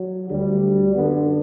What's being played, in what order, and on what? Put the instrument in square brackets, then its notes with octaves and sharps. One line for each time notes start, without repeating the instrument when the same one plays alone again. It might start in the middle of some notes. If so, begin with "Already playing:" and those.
Already playing: [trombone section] F#3
D2 D3 G3
F#2 D3 B3